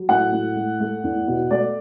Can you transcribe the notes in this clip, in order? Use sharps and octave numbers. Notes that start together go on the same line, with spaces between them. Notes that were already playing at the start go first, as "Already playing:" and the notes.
Already playing: F#3
A2 F#5
A2
A3
A3
E2
B2
A3 D5